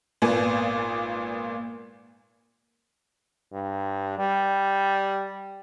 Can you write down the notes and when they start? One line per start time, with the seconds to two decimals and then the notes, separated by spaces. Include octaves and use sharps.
0.22 G#1 A#2 B3 D5 G#5
3.53 G2
4.19 G3